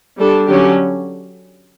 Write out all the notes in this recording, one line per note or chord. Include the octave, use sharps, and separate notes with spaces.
G3 D4 A4
D3 F#3 C#4 G4